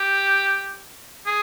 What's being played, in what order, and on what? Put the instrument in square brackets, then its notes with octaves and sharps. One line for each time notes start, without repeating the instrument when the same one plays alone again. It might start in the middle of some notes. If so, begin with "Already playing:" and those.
Already playing: [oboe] G4
G#4